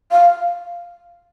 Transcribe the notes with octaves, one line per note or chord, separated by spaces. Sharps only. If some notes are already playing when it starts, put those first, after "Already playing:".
F5